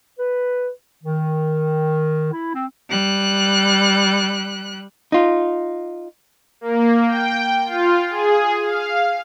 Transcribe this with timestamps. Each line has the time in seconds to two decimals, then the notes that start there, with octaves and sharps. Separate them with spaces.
0.19 B4
1.03 D#3
2.32 E4
2.54 C4
2.89 G3 F#6
5.12 D#4 F4
6.61 A#3
7.07 G5
7.65 F4
8.10 G#4
8.62 F5